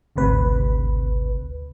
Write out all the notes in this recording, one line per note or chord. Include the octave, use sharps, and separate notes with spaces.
G#1 D2 C3 B4